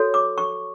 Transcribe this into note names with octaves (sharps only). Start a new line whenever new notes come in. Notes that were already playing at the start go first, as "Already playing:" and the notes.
Already playing: F#4 A4 C#5
D6
C#6